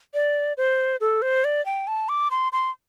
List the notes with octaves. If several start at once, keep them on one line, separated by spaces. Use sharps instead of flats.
D5
C5
A4
C5
D5
G5
A5
D6
C6
C6